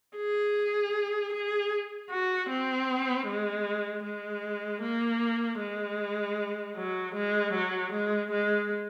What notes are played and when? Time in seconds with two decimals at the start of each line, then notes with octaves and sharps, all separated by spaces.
0.17 G#4
1.33 G#4
2.11 F#4
2.49 C4
3.27 G#3
4.04 G#3
4.82 A#3
5.60 G#3
6.76 F#3
7.15 G#3
7.53 F#3
7.93 G#3
8.31 G#3